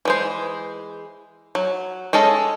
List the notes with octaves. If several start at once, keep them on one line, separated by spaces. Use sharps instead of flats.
E3 G#3 C5
F#3
G#3 C#4 A4 D#5